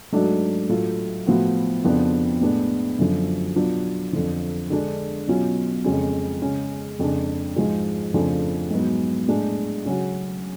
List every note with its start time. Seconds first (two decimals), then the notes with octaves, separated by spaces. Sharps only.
0.12 G#2 F#3 A3 D4 F#4
0.69 A2 F#3 A3 F4
1.27 A2 F3 B3 F#4
1.84 F2 C#3 F3 B3 D4
2.41 A2 G#3 B3 D4
2.98 F#2 D3 F3
3.56 B2 F#3 B3 D4 F4
4.13 F2 D3 F3
4.70 D3 G#3 D4
5.27 B2 F#3 C#4 F4
5.84 F2 C#3 G#3 C#4
6.42 C#3 G#3 C#4
6.99 F2 C#3 G#3 D4
7.56 G#2 F3 G#3
8.14 F2 C#3 F3 A3 D4
8.71 G#2 F#3 B3
9.28 A2 G#3 D4
9.85 C#3 F#3 C#4 F#4